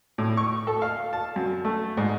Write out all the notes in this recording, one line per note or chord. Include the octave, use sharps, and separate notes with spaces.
A2
C#6
A4
F5
A5
F#2
A3
G#2